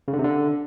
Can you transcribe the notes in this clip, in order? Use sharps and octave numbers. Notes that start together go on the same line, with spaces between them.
C#3
D3
C3
D3